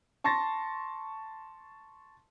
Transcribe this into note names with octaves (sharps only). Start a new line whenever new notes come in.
A5 C6 C#6 A6 A#6